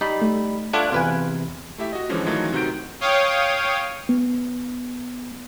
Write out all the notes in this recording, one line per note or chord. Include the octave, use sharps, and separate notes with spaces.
G3 D#4 B5
A3
A3 D4 F4 A4 F#5 F#6 G#6 D7
E2 C3 F4 B4 G#5
A3 E4 G4 E5
F#4 D#5
D3 E3 F3 G#3 C#4
D#3 E3 F#3 A3 D#4 F4
C3 D#3 D#4 F#4 G6 D7
C#5 F5 G5 D#6
B3